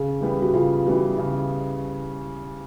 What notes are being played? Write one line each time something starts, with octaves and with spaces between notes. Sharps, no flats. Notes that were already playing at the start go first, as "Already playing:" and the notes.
Already playing: C#3 G#4
E3 G3 B3
F#4
C#3 F4
E3 G3 B3 F#4
C#3